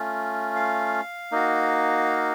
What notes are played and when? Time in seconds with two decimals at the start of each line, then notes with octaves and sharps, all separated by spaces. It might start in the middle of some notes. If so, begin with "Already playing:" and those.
Already playing: A3 C#4 F4
0.56 F5
1.32 A#3 D#4 F#4